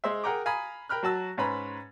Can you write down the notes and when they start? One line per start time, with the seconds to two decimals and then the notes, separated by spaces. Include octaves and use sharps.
0.04 G#3 C5 E5
0.24 G#4 A#4 F#5 G5 A#5 D6
0.46 F5 G#5 A#5 B5 D#6
0.89 A#4 G5 B5 F6 F#6
1.03 F#3 F#4 A5 E6
1.38 G#2 C#4 B4 C5 A#5 B5